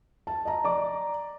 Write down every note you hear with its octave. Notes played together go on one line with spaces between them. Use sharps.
A5
D#5 A#5
D5 D6